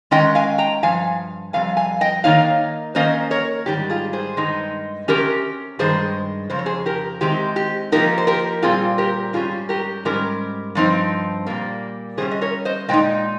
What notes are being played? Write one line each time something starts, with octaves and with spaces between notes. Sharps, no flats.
D#3 G#3 C#4 D#5 G5
F5 G#5
G5 A#5
G2 F3 F5 G#5
F2 C3 G3 F5 G#5
F5 G#5
D#5 G5
D#3 A#3 D#4 C#5 F5
D#3 A#3 C#4 C5 D#5
A#4 C#5
G#2 D#3 G3 G4
F4 G#4
G#4 C5
G2 D#3 G#3 D#4
C3 G3 C#4 G4 A#4
G2 D#3 G#3 G#4 C5
F2 C#3 C5
C#5
G#4 C5
G4 A#4
C3 D#3 G#3 C4 D#4 G4
G4
C3 F3 A#3 D#4 G4 A#4
C5
G4 A#4
A#2 G3 C4 F4 G#4
G4 A#4
G#2 G3 C#4 F4 G#4
G4 A#4
G#2 G3 C#4 G4 A#4
G2 F3 C4 D#4
A#2 G3 A#3
C3 G3 C#4 G#4 C5
D#5
A#4 C#5
C5 D#5
A#2 G#3 D#4 D#5 G5